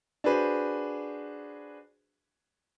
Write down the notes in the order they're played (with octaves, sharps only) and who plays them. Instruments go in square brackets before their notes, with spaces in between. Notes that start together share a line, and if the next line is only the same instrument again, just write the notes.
[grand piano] D4 F#4 G#4 B4 C5